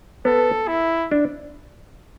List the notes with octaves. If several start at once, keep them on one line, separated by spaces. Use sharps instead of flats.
B3 A4
E4
D4